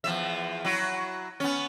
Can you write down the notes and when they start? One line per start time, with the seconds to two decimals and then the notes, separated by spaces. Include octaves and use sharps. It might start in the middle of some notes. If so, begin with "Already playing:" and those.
0.04 E2 F3 E5
0.65 F#3 E4 F#4
1.40 B3 C#4